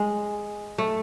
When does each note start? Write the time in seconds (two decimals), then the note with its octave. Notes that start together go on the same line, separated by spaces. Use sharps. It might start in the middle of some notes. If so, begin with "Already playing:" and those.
Already playing: G#3
0.78 A3